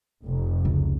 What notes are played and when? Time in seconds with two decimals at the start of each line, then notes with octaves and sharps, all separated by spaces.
0.26 F1
0.65 C#2